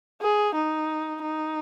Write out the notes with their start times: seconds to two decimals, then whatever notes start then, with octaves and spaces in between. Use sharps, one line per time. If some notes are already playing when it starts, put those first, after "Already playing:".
0.22 G#4
0.55 D#4
1.22 D#4